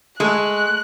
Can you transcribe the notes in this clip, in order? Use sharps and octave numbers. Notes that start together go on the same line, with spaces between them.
G#3 A3 F#6